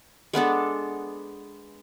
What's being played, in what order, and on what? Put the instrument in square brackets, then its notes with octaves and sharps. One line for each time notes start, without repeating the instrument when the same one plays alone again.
[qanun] G#3 B3 D4 A4